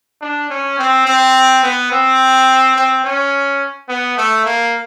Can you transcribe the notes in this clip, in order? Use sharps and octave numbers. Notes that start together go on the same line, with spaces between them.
D4
C#4
C4
C4
B3
C4
C4
C#4
B3
A3
A#3